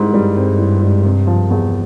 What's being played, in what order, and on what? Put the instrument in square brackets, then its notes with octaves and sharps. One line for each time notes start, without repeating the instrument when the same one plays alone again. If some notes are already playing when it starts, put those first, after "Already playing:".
Already playing: [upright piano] G#2 G3 C4 E4
[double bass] G2 [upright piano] G3
[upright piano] C4
E4
G#2
C3
F3
E2